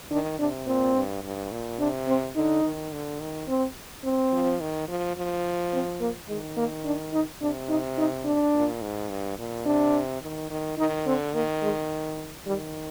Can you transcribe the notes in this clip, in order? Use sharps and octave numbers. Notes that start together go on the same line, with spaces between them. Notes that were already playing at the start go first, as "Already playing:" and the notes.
D#3 D4
C3 D4
A#2 C4
G2
G2
A#2
C3 D4
C4
D3 D#4
D#3
D3
D#3
C4
C4
F3
D#3
F3
F3
C4
A#3
D#3 G#3
A#3
D4
D#4
C3 D4
D#4
D#4
D4
A#2
G#2
G2
A#2
C3 D4
D#3
D#3
D#3 D#4
D3 C4
D#3 A#3
G#3
D#3 G3